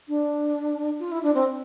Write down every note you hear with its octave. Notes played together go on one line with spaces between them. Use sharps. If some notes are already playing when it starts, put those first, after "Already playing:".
D4
F4
E4
D4
C4